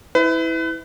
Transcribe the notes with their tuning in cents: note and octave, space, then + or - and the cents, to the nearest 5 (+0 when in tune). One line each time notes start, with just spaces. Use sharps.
E4 -15 B4 +30